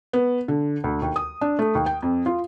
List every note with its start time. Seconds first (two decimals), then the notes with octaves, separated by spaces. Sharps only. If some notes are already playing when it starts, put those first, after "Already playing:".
0.13 B3
0.48 D3
0.84 D2
1.02 D#2
1.16 D#6
1.41 D4
1.59 A3
1.75 D#2
1.86 G5
2.02 F2
2.26 F4